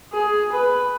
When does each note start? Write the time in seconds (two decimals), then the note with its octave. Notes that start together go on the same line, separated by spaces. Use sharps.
0.13 G#4
0.53 B4